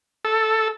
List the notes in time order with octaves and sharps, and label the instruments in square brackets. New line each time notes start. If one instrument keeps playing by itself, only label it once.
[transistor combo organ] A4